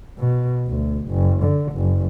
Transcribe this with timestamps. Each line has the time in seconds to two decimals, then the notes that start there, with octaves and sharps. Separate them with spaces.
0.18 B2
0.68 D2
1.08 F#1
1.43 D3
1.73 F#1